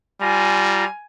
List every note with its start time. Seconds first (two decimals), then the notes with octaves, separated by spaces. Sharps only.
0.21 G3 F4 G#5 A#5